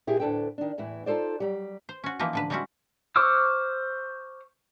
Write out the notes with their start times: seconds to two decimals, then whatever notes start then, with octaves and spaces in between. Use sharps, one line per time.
0.07 A#2 E4 G4 G#4
0.20 D2 A2 D4 A4 B4 G5
0.58 D#3 D4
0.78 E2 A2 E3 E4
1.06 D#4 F4 A4 C5 D5
1.40 F#3 G3
1.89 C5
2.04 C#4 F#4
2.19 E3 F3 A#3 D#4 B4
2.33 A2 D3 B4
2.50 G3 G#3 C4 C#4 E4 F#4
3.16 C5 C#6 D6 E6 F6